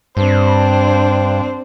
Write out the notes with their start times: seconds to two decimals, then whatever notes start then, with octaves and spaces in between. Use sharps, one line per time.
0.17 G2 C4 D4 C5